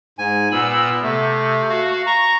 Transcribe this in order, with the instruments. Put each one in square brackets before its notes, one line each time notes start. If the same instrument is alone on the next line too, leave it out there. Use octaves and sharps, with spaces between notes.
[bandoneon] G#2 G#5
[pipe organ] A#2 B5 E6 [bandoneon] B3
[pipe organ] C3 [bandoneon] A3
[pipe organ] F#4 F5
[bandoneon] A#5 [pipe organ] C#6